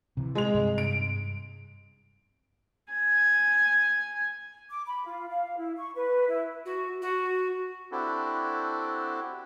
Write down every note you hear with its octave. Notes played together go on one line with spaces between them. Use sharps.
C3 E3
G#3 F7
G2 C3
D7
G#5
D6
B5
F4
F5
E4
C#6
B4
E4
F#4
F#4
C4 D4 E4 F#4 G4 A4